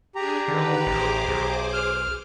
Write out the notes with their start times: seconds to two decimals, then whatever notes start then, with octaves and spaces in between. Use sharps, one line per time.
0.15 D4 G4 G#4 A#5
0.48 D3 D#3 B4
0.87 A1 G#4 C5 D6
1.28 B1
1.73 F6